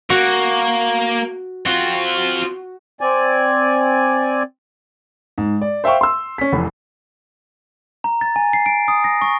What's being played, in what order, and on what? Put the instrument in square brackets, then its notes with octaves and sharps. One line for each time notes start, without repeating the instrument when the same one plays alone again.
[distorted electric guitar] A#3 [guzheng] F#4
[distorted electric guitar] C4 F4 [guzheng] F#4
[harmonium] C4 D5 G#5
[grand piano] G#2
D5
C5 E5 F5 G5 C#6
C6 E6
C#4 B6
F1 E2
[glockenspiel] A#5
A6
G#5
C7
D7
D#6
A#6
C#6